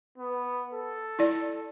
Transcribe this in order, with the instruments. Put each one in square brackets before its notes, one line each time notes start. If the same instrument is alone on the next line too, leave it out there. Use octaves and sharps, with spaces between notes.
[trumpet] B3
A4
[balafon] E4 D5